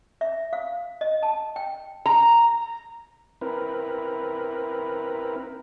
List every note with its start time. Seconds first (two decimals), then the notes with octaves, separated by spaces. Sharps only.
0.21 E5
0.53 F5
1.01 D#5
1.23 A5
1.56 G5
2.06 A#5
3.41 C4 E4 A#4 B4